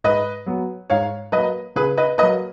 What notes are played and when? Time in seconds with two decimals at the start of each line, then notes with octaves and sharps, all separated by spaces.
0.04 G#2 B4 D#5
0.46 F#3 B3
0.90 G#2 C#5 F5
1.32 F#3 A#3 B4 D#5
1.75 C#3 G#4 B4
1.97 B4 D#5
2.18 A#3 B4 D#5
2.22 F#3